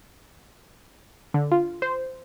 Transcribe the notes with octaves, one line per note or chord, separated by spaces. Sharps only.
D3
F4
C5